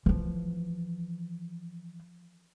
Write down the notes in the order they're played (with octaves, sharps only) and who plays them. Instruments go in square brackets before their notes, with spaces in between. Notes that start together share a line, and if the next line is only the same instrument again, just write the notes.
[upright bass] E3 F3